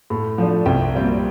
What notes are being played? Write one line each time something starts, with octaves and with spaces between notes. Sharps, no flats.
A2
F3 A3 D4
C2 G5
A#2 G3 C4